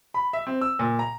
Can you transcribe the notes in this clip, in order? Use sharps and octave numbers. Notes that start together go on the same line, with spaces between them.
B5
E5
C4
E6
A#2
A#5